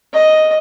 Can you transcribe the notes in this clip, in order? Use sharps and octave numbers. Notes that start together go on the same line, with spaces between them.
D#5